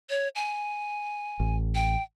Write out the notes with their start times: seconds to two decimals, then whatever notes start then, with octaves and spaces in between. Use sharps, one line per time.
0.10 C#5
0.35 G#5
1.40 A1
1.75 G5